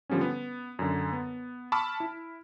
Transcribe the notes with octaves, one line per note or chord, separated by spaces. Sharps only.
D3 F3 G3 B3 C#4
B3
F#2 D3
B3
A5 B5 C#6 D6 E6 F6
E4